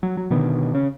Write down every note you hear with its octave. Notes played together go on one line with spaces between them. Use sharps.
F#3
F#3
B2 D3 D#3 B3
C#3 C#4